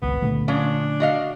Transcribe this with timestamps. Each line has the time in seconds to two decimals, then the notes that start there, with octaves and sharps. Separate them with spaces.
0.02 G#1 C#2 B3
0.22 A#2 D3 A3
0.48 F3 C#4 D4
1.00 F#4 D#5 F5